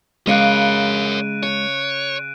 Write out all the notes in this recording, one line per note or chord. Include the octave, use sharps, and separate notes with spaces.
C#3 G#3 A#4 C#5 F5 F#6 D7 D#7
C#5 A5